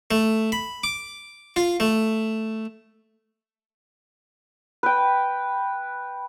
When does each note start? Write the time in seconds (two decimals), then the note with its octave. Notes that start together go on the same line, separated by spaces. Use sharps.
0.11 A3
0.52 B5
0.84 D6
1.56 F4
1.80 A3
4.83 B4 G5